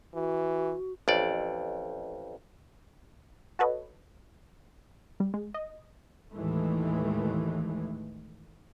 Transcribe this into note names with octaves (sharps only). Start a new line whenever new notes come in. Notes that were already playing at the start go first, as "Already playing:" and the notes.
E3 F#4
A1 F2 D5
F#4 A4 B4 C#5 D#5
G3
G#3
D#5
D#2 A2 E3 G#3 A3